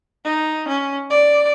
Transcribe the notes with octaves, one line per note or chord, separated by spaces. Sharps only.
D#4
C#4
D5